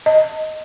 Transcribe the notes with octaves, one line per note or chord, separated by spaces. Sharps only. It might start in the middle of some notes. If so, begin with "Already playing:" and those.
D#5